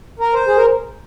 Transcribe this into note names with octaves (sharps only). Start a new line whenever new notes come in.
A#4
C5
G#4
A#4